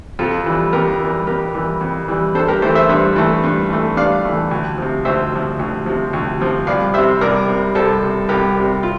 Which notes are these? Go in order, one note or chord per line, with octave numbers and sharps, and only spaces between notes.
F2 F4 A4
E3 G3
F2 G4 A#4
E3 G3
F2 G4 A#4
E3 G3
F2
E3 G3
G2 A4 C5
G4 A#4
E3 A3 A4 C5
C5 E5
G2 C5 E5
E3 A3
G2
E3 A3
G2 D5 F5
E3 A3
D2
C3 F3
D2 C5 E5
C3 F3
D2
C3 F3
D2
C3 F3
C2 D5 F5
C3 G3 C5 E5
C2 A#4 D5
C3 G3
C2 A4 C5
C3 G3
C2 G4 A#4
C3 G3
F4